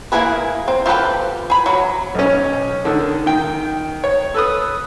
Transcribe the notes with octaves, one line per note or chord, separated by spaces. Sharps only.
A#3 D4 E4 G#4 B4
C4
F4 G4 A4 B4 G5
G#4 B5
F#3 B5
B1 C#4
D3 D#3
D#3 G5
C#5
A4 B4 D#6